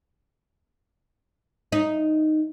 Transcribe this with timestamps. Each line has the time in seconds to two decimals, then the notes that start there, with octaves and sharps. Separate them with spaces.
1.72 D#4